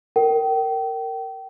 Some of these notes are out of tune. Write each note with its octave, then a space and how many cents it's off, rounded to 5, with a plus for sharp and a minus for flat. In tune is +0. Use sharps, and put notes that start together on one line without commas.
A#4 -20 G5 -30